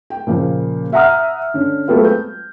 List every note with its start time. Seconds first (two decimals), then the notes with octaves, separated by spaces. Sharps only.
0.10 G5
0.27 A#2 C#3 F3
0.92 E5 F#5 A#5 D#6 F6
1.54 D3 C#4
1.88 F#3 G#3 A3 B3 C4 F4
2.04 G6